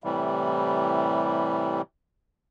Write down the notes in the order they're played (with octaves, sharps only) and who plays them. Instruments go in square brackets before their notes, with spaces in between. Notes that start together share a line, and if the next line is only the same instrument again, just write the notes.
[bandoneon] A2 C3 E3 G3